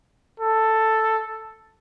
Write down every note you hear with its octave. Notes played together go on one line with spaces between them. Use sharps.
A4